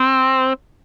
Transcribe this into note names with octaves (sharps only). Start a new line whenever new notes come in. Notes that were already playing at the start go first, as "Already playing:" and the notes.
Already playing: C4